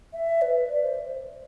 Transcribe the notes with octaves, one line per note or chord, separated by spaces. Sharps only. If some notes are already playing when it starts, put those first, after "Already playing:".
E5
B4
D5
C5